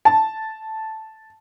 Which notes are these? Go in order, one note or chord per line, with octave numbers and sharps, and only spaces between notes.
A5